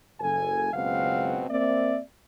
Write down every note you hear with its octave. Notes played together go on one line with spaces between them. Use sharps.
F#1 A4 G#5
F#1 C#2 B2 C4 F5 F#5
A#3 C4 D5 E5